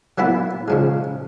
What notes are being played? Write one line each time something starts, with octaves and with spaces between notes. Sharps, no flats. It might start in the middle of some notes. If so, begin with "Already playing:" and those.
F#3 A#3 B3 E4
C#3 F3 G#3